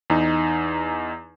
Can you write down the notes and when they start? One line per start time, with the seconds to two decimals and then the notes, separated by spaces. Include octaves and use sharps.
0.10 E2 D#4